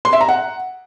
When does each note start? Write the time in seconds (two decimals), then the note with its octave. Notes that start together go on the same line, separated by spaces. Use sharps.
0.05 C6
0.13 E5
0.21 A#5
0.28 F#5